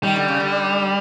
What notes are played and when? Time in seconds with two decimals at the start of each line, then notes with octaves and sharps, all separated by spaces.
0.03 D#3 G3
0.16 D3
0.28 C#3
0.40 D3